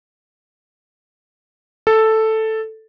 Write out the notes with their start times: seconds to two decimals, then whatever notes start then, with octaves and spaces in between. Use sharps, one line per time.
1.87 A4